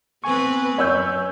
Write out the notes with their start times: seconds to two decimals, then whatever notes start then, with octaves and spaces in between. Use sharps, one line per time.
0.24 B3 C4 B4 G#5 C#6
0.78 F#2 C#5 E6 G6